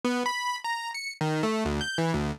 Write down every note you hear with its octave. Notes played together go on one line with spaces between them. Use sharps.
B3
B5
A#5
C#7
D#3
A3
D2
G6
E3
D2